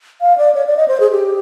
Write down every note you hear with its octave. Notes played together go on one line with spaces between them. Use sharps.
F5
D5
C#5
D5
D#5
C5
G#4
G4